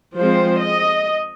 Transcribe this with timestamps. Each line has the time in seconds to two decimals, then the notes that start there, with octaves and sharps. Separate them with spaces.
0.18 F3 G#3 C4 C5
0.63 D#5